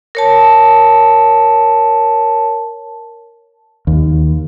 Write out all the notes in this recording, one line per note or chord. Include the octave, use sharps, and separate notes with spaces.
A#4 C#5 A5
D#2